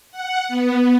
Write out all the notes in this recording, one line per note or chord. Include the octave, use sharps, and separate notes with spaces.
F#5
B3